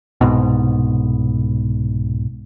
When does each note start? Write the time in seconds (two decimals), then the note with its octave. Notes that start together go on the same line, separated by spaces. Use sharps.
0.21 C2 G#2 B2